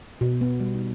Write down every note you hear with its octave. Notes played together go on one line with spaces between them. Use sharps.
B2
B3
G3
D#4